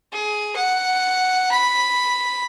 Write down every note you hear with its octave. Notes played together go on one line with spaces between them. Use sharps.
G#4
F#5
B5